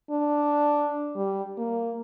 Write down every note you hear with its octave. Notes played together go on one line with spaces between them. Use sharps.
D4
G3
A#3